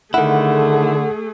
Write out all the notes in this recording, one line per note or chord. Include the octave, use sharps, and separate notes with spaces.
D3 D#3 A3 E4 G#4 A4 F#5